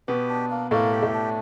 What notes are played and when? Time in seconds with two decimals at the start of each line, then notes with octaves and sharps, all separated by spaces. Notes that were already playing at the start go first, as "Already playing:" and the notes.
0.08 B2 B3 G4
0.29 D4
0.51 A#3
0.71 A2 A3 A#3
0.92 G4
1.03 A2 A3
1.14 D4